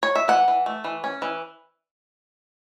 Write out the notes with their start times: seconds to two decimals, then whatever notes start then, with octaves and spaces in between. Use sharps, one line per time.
0.03 C#5
0.15 E5
0.28 E3 F#5
0.48 E3
0.66 A3
0.84 E3
1.04 C#4
1.22 E3